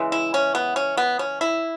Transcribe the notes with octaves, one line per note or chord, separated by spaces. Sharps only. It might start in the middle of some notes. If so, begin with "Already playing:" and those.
Already playing: C#3 E3 G#3
E4
C#4
B3
C#4
B3
C#4
E4